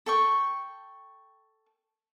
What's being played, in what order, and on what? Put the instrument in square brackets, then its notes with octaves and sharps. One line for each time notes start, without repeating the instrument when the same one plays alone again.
[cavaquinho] A4 G5 C#6